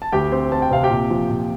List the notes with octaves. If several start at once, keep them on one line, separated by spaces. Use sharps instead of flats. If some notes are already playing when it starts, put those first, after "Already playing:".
A5
D2 G4 G5
C4
C4 A5
G5
C3 F5
G4 G5
A#2
F3
A#2